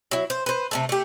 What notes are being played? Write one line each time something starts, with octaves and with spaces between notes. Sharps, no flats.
F#3 E4
C5
B4 C5
C3 A3 A4
A3 G4